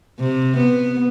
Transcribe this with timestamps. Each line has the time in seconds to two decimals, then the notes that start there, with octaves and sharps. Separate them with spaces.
0.19 C3
0.58 B3